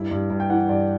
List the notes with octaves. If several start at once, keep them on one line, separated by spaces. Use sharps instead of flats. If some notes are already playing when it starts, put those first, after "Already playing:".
Already playing: G2 E4
G2
G2
G5
E3 F#5
G2 D5